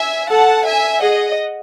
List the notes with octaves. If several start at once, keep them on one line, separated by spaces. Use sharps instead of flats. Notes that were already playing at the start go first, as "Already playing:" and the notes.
Already playing: E5 G#5
A4 F#5 A5
E5 G#5
G#4 D#5 F#5